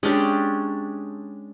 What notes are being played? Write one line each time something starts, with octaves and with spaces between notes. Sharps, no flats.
G#3 C#4 D4 G4